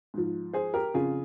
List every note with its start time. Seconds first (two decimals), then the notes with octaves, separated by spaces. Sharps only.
0.14 G#2 F3
0.53 G#4 C5
0.74 G4 A#4
0.94 F2 C#3 F3 F4 G#4